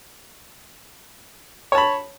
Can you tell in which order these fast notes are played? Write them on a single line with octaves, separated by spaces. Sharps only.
C#5 A5 B5